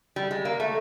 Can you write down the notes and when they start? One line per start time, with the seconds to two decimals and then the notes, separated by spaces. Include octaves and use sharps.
0.16 G3
0.31 G#3
0.45 A#3
0.60 A3